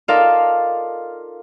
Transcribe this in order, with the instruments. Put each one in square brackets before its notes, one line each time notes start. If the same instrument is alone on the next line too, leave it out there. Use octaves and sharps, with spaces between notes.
[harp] D#4 F4 A4 A#4 D5 F5